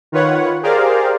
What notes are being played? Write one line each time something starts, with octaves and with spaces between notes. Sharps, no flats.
D#3 F4 B4 C#5 F#5
G4 G#4 A#4 C5 D5 F5